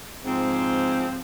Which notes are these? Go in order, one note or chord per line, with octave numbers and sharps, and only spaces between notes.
G#2 F3 C4